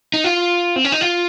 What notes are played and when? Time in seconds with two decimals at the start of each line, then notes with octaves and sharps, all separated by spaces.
0.14 D#4
0.24 F4
0.76 C4
0.85 C#4
0.92 D#4
1.01 F4